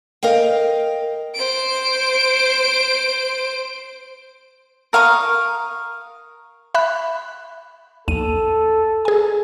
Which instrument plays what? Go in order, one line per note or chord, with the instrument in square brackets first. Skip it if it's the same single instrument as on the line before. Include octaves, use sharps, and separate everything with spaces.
[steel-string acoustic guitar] A#4 D#5 F5 G5
[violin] C5 D7
[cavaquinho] A#4 F5 C#6 D#6
[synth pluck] E5 B5 F#6
[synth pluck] A#1 D#2 D#7 [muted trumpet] A4
[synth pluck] G#4 G#5